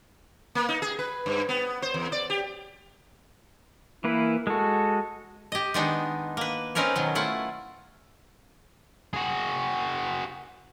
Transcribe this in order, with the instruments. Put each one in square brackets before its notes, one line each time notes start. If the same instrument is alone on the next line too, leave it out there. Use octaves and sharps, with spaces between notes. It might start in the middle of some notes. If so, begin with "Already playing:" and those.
[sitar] A#3
D#4
G#4
B4
G2
B3
C5
E2
D5
G4
[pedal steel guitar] E3 A#3 B4 [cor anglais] E4
[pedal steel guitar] G#3 F#4 [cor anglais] A4
[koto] G4 D#5
D#3 G#3 B3 D4 D#4
A#3 B4
C4 C#4 D#4 A#4 B4 C#5
B2 D#3 F#3
A3 E4 F4 F#5
[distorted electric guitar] F#4 G#4